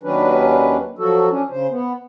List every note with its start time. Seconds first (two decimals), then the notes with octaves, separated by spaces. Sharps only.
0.03 D#2 D#3 F#3 C#4 D4 B4
0.99 F3 F#3 F#4 A4
1.30 C#4 D4
1.51 C#3 C5
1.70 B3